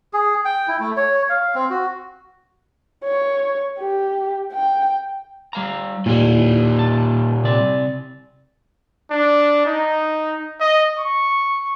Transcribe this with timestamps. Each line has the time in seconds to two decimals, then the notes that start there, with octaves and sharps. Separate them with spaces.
0.13 G#4
0.45 G5
0.68 E4
0.80 A3
0.97 C#5
1.29 F5
1.55 C4
1.70 F#4
3.04 C#5
3.79 G4
4.53 G5
5.53 G3 F5 A#5
6.06 A#2 G3 E4
6.79 A5
7.44 C3 D5
9.11 D4
9.66 D#4
10.60 D#5
10.98 C#6